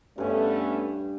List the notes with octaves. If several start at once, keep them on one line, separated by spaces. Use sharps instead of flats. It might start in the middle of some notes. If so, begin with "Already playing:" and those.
G2 A3 B3 C#4 G#5